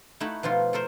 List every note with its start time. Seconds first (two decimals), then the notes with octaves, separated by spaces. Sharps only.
0.20 A3 D#4 E4 F#4
0.43 B2 F3 D#4 F4 C6
0.73 A3 A4 A#4 C5